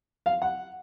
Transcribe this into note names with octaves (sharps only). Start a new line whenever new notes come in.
F5
F#5